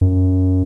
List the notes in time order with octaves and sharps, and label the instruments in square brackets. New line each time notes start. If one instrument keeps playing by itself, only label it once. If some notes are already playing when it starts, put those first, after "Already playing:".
[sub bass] F#2